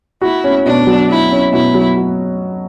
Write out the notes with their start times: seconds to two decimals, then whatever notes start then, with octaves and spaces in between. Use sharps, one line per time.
0.22 E4 F#4
0.44 C#4
0.66 B2 D4
0.87 F#3
1.09 E4 F#4
1.31 C#4
1.53 B2 E4
1.74 F#3
1.96 F#4